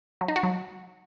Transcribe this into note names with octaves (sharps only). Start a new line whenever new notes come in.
F#3
D#4
F#4
F#3